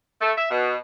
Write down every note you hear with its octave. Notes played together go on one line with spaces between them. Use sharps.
A3
E5
B2